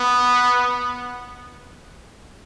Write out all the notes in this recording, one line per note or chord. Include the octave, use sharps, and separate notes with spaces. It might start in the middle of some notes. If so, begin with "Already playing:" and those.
Already playing: B3